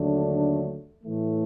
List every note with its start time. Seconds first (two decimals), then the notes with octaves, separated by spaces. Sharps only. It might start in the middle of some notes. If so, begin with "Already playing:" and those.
Already playing: D#2 D3 F#3 A3 D4
1.04 A2 E3 A3